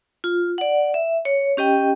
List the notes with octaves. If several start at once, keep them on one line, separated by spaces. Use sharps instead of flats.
F4
D5 F#5
E5
C#5
C#4 G4 D#5 G5